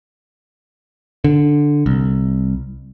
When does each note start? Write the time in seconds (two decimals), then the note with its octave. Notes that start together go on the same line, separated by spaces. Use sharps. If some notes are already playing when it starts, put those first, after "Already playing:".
1.24 D3
1.86 C2